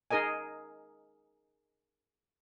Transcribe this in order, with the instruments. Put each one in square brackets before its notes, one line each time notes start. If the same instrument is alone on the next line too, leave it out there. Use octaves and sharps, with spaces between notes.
[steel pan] D#4 G#4 A#4 D#5 G#5